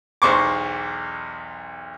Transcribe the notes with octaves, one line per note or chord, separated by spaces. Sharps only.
B1 E2 C5 C#6 D6